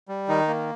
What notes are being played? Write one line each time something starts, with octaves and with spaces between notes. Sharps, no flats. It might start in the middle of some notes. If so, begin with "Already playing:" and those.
G3
D#3 D#4
A#3